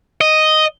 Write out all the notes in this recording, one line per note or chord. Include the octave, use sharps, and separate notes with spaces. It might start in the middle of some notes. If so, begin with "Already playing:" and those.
D#5